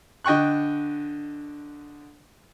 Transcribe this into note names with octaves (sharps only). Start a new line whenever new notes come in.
D3 D#5 G5 C#6 F#6